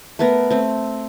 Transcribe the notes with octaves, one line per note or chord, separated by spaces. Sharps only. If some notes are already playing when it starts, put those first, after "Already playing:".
A3 B3 A#4
A3 C4